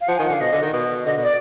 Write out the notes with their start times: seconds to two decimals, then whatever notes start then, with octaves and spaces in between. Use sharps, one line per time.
0.01 F5
0.08 F3 F#5
0.17 D#3 G#5
0.25 F#5
0.30 D3 F5
0.41 B2 D#5
0.52 D3
0.62 D#3
0.73 B2
1.06 D3 D#5
1.17 B2
1.22 D5